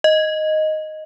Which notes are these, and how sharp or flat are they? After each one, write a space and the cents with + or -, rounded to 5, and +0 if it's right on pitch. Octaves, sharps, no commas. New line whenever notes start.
D#5 +0